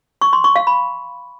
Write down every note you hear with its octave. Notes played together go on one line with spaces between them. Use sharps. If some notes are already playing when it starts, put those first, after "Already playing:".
C#6
C6
C#6
F5
B5